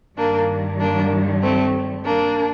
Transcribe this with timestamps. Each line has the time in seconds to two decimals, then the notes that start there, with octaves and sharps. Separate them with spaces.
0.18 G2 D#3 G3 A#3 D4
0.80 A#3 D4
1.42 A3 C4
2.05 A#3 D4